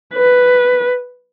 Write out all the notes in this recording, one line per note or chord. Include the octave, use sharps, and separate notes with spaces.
B4